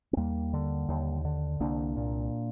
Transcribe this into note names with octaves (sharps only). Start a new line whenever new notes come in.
C4
D#2 G3 A#3
D3
D#2
D3
C2 A#3 D4
A#2